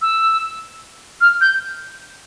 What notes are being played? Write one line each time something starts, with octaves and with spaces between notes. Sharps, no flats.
E6
F6
G6